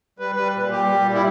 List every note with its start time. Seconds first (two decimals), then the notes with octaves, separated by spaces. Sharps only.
0.19 G3 B4
0.36 G3 B4
0.54 A#2
0.71 G3 G4
0.89 G3
1.05 A#2
1.14 E4